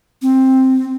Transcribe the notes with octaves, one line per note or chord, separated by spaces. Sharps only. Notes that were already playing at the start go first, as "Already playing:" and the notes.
C4